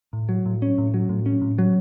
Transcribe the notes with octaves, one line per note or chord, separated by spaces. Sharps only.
A2
F#3
A2
C#4
A2
F#3
A2
C#4
A2
F#3